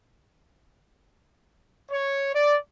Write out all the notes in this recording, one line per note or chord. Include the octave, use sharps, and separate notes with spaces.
C#5
D5